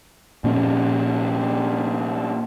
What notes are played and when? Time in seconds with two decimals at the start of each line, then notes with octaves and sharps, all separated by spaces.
0.44 A#2 F3 C#4